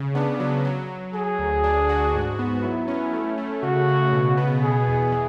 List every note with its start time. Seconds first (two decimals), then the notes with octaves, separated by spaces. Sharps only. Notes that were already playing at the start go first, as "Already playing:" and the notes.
Already playing: C#3
0.15 B3 D4
0.40 F#3
0.65 F#3
0.89 F#3
1.13 F#3 G#4
1.39 D2
1.64 D4
1.89 F#4
2.14 G#2
2.39 B3
2.63 F#3 E4
2.88 C#4
3.13 A3
3.38 A3
3.63 C#3 F#4
3.88 C#3
4.13 B2
4.37 B3
4.62 B2 G#4
4.88 E2
5.12 E3